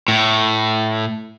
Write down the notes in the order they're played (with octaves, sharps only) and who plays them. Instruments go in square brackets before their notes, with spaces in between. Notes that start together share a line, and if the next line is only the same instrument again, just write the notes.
[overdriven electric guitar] A2